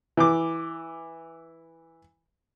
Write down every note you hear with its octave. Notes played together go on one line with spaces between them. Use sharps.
E3 D6